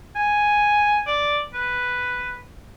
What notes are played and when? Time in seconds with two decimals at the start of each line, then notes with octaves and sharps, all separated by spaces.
0.16 G#5
1.07 D5
1.54 B4